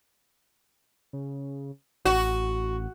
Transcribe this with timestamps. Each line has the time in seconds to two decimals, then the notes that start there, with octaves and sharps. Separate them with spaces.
1.13 C#3
2.05 A1 F#4